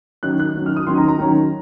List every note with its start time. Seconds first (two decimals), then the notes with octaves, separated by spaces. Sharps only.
0.23 D#3 F#3 C#4 F#6
0.40 F#6
0.55 D#3 F#3 C#4
0.66 F6
0.77 D#6
0.87 D#3 F#3 C#4 C6
0.98 A#5
1.08 A#5
1.19 D#3 F#3 C#4